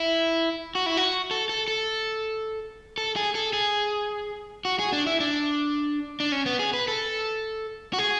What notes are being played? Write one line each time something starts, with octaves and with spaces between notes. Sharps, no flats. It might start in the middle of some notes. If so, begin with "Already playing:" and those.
Already playing: E4
F#4
E4
F#4
A4
A4
A4
A4
G#4
A4
G#4
F#4
G#4
D4
E4
D4
D4
C#4
B3
G#4
B4
A4
F#4
G#4